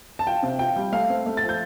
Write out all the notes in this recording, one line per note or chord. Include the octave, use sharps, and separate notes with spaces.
A5
F4 G5
C3
F4 G5
G3
A3 F5
C4
A3
A6
F3
G6